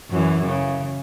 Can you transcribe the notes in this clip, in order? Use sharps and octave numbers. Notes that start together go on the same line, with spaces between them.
F#2 E3
C#3